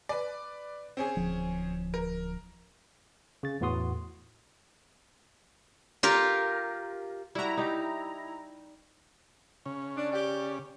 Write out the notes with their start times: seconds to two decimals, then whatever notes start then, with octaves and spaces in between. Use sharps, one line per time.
0.09 B4 D5
0.97 C4 C#4 G#4
1.17 D1 F3
1.94 A#4
3.43 C#3 A6
3.61 E2 A2 B3 F#4 C6 D#6
6.03 F4 G4 A#4
7.35 G3 E4 F#4 A#5
7.57 D#4 G4
9.66 C#3 C#4
9.97 D4
10.12 G4 D5